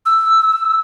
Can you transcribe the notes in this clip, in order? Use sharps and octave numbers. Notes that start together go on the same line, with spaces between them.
E6